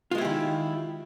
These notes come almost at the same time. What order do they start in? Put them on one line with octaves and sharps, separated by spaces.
F4 G#3 E4 G4 D#3